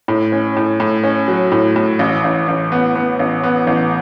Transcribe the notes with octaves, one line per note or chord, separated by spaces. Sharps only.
A2
C#4
A2
A2
C#4
F#3
A2
A2
A1
A1
A1
B3
B3
A1
B3
A1